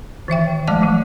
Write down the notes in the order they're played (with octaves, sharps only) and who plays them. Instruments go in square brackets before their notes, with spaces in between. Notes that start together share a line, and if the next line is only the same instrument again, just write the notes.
[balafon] D#3 E3 E5 G5
F3 G#3 A3 D5 A5 D6
E3 F#3 A3